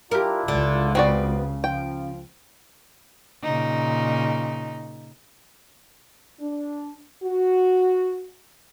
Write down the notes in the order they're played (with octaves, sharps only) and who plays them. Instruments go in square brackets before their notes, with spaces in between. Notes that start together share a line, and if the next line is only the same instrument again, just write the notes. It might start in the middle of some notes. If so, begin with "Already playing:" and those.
[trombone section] D4 E4 F4 [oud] G4 A#4
[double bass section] C#2 [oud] D3
[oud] C#3 [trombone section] B3 [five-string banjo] C4 F#4 D5
[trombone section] F3 [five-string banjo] G5
[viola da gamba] A#2 C#3 D#4
[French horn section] D4
F#4